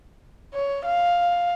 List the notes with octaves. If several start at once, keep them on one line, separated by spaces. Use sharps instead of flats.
C#5
F5